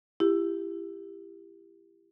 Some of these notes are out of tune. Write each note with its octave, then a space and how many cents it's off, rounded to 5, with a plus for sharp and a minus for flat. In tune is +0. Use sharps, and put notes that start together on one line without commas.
E4 +30 G4 +15